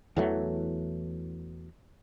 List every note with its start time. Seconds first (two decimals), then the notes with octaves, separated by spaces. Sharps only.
0.17 E2 E3 F#3 A3